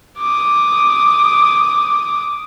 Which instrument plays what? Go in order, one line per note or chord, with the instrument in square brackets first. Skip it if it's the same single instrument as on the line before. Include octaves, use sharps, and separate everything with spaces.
[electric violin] D6 D#6